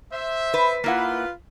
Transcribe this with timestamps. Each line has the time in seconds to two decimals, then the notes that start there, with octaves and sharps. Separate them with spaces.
0.12 C5 E5
0.54 B4
0.84 A#3 E4 F4 B4 F#5